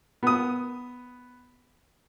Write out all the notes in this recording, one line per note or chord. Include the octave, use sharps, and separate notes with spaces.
B3 D#6